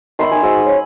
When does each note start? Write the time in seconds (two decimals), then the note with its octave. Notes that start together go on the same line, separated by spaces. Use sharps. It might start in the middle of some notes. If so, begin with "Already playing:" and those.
0.19 D#3 E5 B5 C6
0.31 D#4 G#5 D#6
0.43 G#2 F#4 E6
0.65 C#5